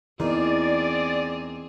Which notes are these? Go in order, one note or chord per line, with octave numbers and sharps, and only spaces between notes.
E2 E3 A#3 C4 D#4 G#4 D5